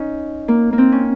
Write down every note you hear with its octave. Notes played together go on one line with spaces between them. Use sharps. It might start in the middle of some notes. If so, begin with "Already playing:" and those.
Already playing: C#4 D#4
A#3
A#3
C4
C#4